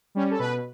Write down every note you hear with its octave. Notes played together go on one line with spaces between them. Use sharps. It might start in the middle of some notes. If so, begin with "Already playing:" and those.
G3 C#4
A4
B2 B4